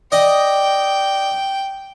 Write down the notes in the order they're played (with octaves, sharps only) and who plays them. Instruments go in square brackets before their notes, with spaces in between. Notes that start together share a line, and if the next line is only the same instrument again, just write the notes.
[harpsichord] D5 D#5 [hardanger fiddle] G5